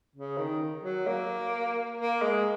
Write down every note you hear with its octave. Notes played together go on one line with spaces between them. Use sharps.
C#3
D#3
F#3
A#3
A#3
G#3